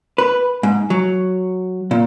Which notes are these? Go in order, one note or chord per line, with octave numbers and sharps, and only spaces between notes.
B4
G#2
F#3
A#2